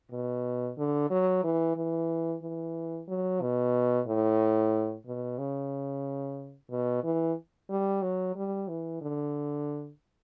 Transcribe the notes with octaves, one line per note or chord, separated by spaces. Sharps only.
B2
D3
F#3
E3
E3
E3
F#3
B2
A2
B2
C#3
B2
E3
G3
F#3
G3
E3
D3